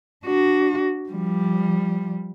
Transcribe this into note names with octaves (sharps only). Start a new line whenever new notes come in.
D4 F#4
F3 G3